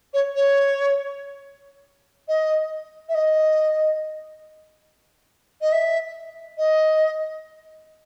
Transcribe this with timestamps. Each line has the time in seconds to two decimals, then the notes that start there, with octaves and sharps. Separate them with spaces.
0.13 C#5
0.35 C#5
2.28 D#5
3.09 E5
3.14 D#5
5.61 D#5
5.72 E5
6.58 D#5